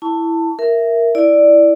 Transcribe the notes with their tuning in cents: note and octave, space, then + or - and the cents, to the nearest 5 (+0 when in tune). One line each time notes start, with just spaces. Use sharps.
E4 +0 A5 +20 C#6 +35
A#4 +0 E5 +5
E4 +0 D5 +0